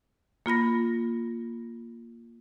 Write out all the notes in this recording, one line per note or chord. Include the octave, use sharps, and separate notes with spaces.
A#3 F4 B5 A#6